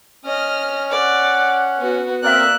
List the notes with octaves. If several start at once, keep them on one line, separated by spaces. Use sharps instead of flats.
C#4 D#5 F6
D5 F#5
B3 F#4
A#3 C4 A#4 D5 E5 F#6